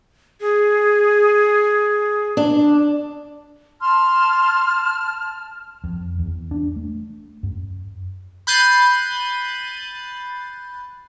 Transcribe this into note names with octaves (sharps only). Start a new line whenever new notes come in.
G#4
D4
A5 C6 F6
F2
E2
D4
A3
F#2
B5 F#6 G6 A6 C7 D#7